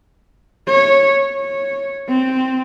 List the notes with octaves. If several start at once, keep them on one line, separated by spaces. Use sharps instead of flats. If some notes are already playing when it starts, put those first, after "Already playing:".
C#5
C#5
C4